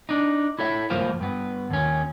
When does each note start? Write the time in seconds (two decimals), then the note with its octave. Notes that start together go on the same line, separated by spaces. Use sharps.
0.09 D4 D#4
0.59 E4 A4 C#5 E5
0.90 C#2 G2 F3 A#3 F4 C5
1.21 G2 B3
1.71 D#2 C#4